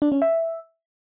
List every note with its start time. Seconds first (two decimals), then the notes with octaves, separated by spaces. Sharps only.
0.02 D4
0.12 C#4
0.22 E5